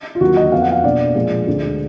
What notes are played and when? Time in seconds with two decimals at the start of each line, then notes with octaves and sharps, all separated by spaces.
0.15 F4
0.21 D#2 D3 F#3 A#3 F#4
0.36 D#5
0.52 F2 F3 B3 F5
0.62 F#5
0.72 F5
0.84 B2 A#3 D4 D5
1.15 A#2 F3 G#3
1.47 D2 D3 G#3